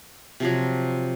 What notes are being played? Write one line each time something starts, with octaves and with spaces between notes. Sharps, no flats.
C3 F3 F#3